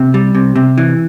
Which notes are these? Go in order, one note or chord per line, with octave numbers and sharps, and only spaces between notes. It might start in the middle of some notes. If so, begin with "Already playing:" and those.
Already playing: C3
G3
C3
C3
E3